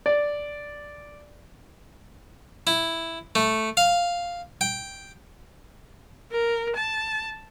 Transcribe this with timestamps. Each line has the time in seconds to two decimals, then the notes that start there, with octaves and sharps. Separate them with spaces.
0.06 D5
2.67 E4
3.35 A3
3.77 F5
4.61 G5
6.32 A#4
6.76 A5